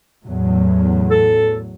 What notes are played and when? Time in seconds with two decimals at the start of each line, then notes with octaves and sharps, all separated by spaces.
0.25 E2 A2 F#3
1.11 A4